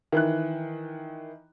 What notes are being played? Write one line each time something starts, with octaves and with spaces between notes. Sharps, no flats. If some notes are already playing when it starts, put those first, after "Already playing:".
D#3 E3 F#6